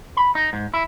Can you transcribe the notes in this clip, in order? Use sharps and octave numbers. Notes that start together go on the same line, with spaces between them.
B5
D#4
G#2
E4